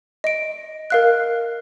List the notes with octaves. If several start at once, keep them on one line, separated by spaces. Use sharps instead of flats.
D#5 D7
A#4 F5 F#6